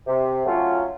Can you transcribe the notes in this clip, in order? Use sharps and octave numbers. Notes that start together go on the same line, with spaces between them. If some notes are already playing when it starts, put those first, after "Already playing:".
C3
F#3 A3 C#4 F4